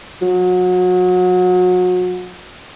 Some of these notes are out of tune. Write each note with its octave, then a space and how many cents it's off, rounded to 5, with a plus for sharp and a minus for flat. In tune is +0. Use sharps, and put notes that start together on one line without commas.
F#3 -30